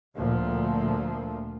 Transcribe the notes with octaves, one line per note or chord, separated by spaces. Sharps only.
D2 A#2 F3